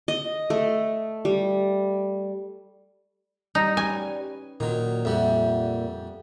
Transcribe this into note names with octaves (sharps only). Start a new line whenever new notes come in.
D#5
A3
G3
G3 D#4
C#4 B4 C#5 G#5
A#2 D#3 F#3 A#3
F2 G3 E5 F#5